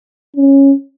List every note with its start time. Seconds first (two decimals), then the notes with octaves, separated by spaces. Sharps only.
0.37 C#4